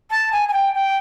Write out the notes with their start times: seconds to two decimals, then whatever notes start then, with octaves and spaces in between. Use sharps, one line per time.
0.10 A5
0.32 G#5
0.48 G#5
0.53 G5
0.74 G5